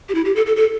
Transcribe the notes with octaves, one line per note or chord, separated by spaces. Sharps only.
G4
E4
G4
A4
A4
A4